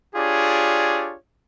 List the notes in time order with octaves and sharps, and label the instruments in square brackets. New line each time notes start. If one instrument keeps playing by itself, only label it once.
[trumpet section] D4 F4 G4 G#4 C#5 D5